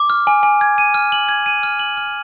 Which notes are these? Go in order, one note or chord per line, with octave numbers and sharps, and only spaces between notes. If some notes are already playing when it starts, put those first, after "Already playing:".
Already playing: D6
F6
G#5
G#5
G#6
D#7
F6
F#7
G#6
D#7
F6
F#7
F6